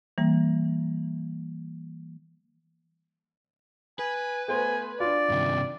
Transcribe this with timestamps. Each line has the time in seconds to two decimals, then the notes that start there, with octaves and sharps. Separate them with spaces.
0.18 E3 G3 A#3
3.99 B4 G#5
4.48 A3 B3 C5 G#5
5.00 D4 F4 D5
5.30 G2 C3 D#3